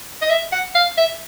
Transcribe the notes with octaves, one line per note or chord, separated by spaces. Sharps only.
D#5
E5
F#5
F5
E5